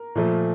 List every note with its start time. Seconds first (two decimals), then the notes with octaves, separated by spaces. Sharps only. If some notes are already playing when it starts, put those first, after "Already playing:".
Already playing: A#4
0.15 A#2 F3 A3